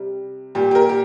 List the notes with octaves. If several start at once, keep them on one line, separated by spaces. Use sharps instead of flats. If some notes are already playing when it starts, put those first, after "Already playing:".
Already playing: C3 G3
A#2 G3 G4
G4
A#4
G4